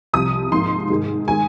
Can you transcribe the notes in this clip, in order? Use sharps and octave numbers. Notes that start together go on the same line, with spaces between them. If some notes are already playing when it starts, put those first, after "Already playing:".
C2 C3 F3 D#6
G#2 F3 A#3 D#4 C6
G#2 D#3 G#3
D#3 G#3 G#5